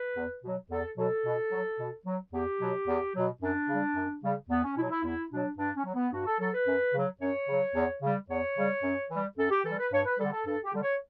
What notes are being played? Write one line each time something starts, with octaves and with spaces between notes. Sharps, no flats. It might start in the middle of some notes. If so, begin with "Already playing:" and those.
Already playing: B4
E2
B2 F#3
E2 A4
B2 F#3 A4
B2
F#3
B2
F#3
E2 G4
B2 F#3
E2
B2 F#3
F#2 D4
C#3 G3
F#2
C#3 G3
E2 B3
C#4
B2 F#3 E4
E4
E2 E4
B2 F#3 D4
G2 D4
C#4
F#3
B3
G2 F#4
A4
F#3 A4
B4
F#2
C#3 F#3
F#2 C#5
C#3 F#3
E2
C#3 G3
E2 C#5
C#3 G3
F#2
E3 G3
F#2 A4
G4
E3 G3 A4
B4
G2 C#5
B4
D3 G3 A4
A4
G2 A4
G4
D3 G3
C#5